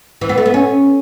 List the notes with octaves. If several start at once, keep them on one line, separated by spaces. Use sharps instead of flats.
E3
B3
A3
B3
C#4